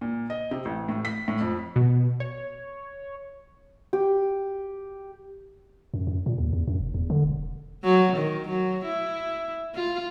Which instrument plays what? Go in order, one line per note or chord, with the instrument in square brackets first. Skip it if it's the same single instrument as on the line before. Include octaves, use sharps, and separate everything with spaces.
[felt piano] A#2
D#5
C3
A1
A2
B6
A2
F2
[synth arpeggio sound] B2
C#5
[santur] G4
[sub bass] F#2
F#2
A#2
D#2
E2
F#2
F1
E2
D3
E1
[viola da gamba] F#3
D#3
F#3
E4
F4